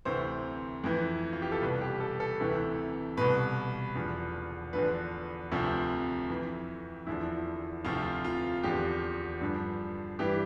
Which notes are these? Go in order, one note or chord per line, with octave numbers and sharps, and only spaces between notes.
D2 C3 E3 C5
F2 E3
F4
G4
A4
C2 B2 B4
G4
A4
A4
D2 C3 E3
C2 B2 B4
E2 D3 F3
E2 D3 F3 B4
D2 C3 F3
F2 E3
E2 D3 F3 E4
D2 C3 F3 F4
F4
E2 D3 F3 G4
G2 D3 F3
G2 E3 G4